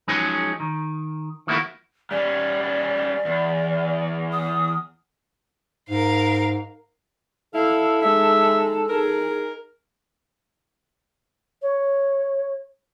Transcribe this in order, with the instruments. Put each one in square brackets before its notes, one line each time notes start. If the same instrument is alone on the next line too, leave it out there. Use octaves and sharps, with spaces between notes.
[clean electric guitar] F3 F#3 G#3 C#4 D#4 G#4
D#3
D#3 F3 A3 A#3 E4 F#4
[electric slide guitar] G3 C#4 [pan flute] D5
[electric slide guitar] E2
[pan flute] D#6
[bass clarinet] G#2 [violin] A#4 F5
[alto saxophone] E4 [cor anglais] A4 [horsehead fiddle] F5
[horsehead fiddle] G#3 D#4 [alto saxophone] E5
[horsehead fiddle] D#4 G#4 [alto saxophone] A#4
[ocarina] C#5